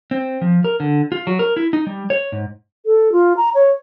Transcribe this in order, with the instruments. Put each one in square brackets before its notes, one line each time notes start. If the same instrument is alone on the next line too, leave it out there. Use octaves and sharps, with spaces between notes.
[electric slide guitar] C4
F3
A#4
D3
F4
F#3
A#4
E4
D#4
G3
C#5
G#2
[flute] A4
F4
A#5
C#5